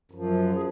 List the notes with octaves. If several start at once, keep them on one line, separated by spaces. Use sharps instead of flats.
F#2 F3
G#4